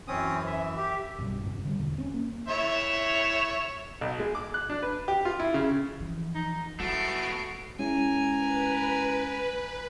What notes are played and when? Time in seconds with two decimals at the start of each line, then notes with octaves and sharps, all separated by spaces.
0.08 F#2 E3 C4 C#4 D#6
0.46 E5
0.77 G4
1.18 B1 G2 B2 G3
1.43 F1 G#2 C3
1.65 D3 F3 G3
1.80 E2 B2 D3
1.98 C4 C#4
2.14 A#3
2.48 E4 C#5 E5
4.01 B1
4.20 G#3
4.35 D6
4.54 F#6
4.70 D4
4.83 B4
5.08 G4
5.25 F4
5.40 E4
5.54 C#3
6.00 E3 F3
6.35 D#4
6.80 F#3 A3 B3 E4 F#4 C7 D7
7.79 G#3 C#4 E4 A#4 G#5
8.36 B4